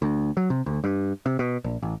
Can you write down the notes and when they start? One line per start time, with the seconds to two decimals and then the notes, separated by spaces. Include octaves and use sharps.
0.02 D2
0.37 F#3
0.50 C3
0.66 D2
0.84 G2
1.26 C3
1.39 B2
1.64 A#1
1.82 A1